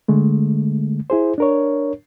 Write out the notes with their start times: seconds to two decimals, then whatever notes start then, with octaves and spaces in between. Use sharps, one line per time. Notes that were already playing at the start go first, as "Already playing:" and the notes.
0.08 D3 G#3 A3
1.10 E4 G#4 C5
1.38 D4 A#4 C#5